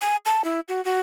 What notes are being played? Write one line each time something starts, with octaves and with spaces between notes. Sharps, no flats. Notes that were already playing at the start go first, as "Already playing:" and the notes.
G#5
A5
E4
F#4
F#4